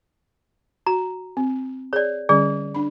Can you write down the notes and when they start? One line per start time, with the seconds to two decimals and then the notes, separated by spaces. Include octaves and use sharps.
0.87 F#4 A#5
1.37 C4
1.93 G#4 C#5 D5
2.29 D3 G3 C#4 G#4 D5
2.74 D4 B5